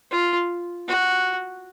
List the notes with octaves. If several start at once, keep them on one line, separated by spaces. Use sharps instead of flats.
F4
F#4